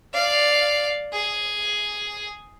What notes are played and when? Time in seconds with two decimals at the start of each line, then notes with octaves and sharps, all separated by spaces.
0.13 D5 F5
1.13 G#4